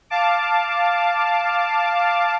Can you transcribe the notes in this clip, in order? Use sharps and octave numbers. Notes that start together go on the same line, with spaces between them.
F5 A5 D6